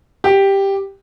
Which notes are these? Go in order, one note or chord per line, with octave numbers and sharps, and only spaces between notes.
G4